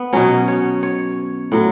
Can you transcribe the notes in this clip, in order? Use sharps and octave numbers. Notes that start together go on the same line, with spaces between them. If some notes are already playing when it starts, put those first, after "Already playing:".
Already playing: B3
B2 F#3 C#4
C#5
C#5
A2 F#3